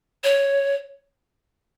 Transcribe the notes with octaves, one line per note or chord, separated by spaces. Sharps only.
C#5